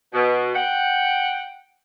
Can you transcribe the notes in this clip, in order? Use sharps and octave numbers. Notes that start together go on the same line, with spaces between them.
B2
F#5 G5